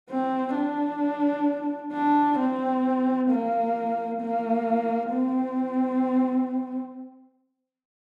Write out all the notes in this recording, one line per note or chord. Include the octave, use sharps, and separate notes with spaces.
C4
D4
D4
C4
A#3
A#3
C4